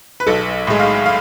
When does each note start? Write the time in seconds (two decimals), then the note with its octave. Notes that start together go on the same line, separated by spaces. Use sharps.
0.20 B4
0.27 B1 A4
0.67 A2 G#3
0.80 F5
1.06 F5